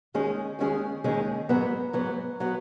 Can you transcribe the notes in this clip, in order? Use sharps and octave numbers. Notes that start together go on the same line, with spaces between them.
D#2 D#3 G#3 C#4 G#4
D#2 D#3 G#3 C#4 G#4
D#2 D#3 G#3 C#4 G#4
G#2 F#3 B3
G#2 F#3 B3
F#3 B3